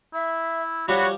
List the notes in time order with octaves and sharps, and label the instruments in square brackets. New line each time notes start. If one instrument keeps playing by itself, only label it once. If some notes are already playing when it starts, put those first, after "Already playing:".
[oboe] E4 [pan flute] E5
[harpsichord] F3 G3 [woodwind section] F#4 [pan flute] C#5 [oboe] B5